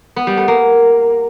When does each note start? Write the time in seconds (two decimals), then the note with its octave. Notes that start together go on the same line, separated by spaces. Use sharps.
0.16 B3
0.27 G3
0.37 A3
0.48 A#3